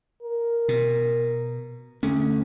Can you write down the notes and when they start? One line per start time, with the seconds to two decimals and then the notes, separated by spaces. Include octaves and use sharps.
0.23 A#4
0.68 B2
2.03 D2 C#4